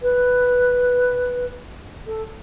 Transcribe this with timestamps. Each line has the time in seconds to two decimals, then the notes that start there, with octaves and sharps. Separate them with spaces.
0.02 B4
2.07 A4